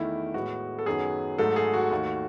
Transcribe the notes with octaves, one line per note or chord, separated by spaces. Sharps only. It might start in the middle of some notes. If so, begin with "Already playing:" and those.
Already playing: E2 D#3 A3 E4
A2 G#3 B3 F#4
A4
F#2 D#3 F#3 B3 G#4
G#2 F#3 A3 A4
G#4
F#4
D#2 D#3 A3